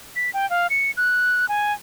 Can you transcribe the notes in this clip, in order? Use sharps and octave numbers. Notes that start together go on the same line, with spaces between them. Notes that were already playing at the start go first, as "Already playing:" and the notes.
B6
G5
F5
C#7
F#6
G#5